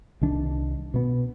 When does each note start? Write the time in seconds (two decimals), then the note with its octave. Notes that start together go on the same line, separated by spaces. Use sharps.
0.21 C2 D#3 D4
0.94 B2 B3